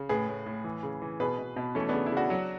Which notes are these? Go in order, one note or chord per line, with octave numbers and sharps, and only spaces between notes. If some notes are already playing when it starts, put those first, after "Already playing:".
Already playing: C#3
A2 G#4 B4
A2
A2
E3
C#3
E3
B2 G#4 B4
B2
B2
E3 A3 C#4
C#3 B3 D4
E4
C#3 D4 F#4
F#3